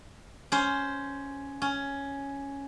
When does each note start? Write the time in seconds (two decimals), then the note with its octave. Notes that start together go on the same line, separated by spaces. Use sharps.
0.52 C#4 C5
1.62 C#4